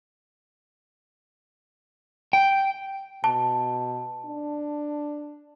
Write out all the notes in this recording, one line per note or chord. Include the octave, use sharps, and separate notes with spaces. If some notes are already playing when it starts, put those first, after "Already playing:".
G5
B2 A5
D4